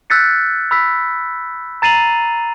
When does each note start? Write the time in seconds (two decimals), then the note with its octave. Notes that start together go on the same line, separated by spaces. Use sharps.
0.10 E6 F#6 G6 A6 B6 C#7
0.71 B5 E6 B6
1.82 A#5 A6 C7 D#7 F7 F#7